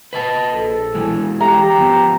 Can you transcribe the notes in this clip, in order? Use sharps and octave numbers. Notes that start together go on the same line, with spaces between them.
B4 D#5 A5
A#1 A4
E3 G#3
G4 A#5
F3 B3